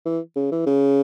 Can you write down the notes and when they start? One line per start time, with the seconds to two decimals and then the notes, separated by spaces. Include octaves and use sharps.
0.06 E3
0.36 C#3
0.51 E3
0.66 C#3